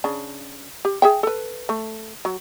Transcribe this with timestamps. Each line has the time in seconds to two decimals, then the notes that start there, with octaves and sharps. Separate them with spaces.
0.04 C#3 D4
0.85 G4
1.02 G#4 E5 G5
1.23 A4 B4
1.69 A3
2.25 F#3